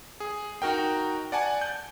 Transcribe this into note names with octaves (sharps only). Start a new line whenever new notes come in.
G#4
D#4 F#4 A#4 G5
D5 F#5 G#5 A5
G6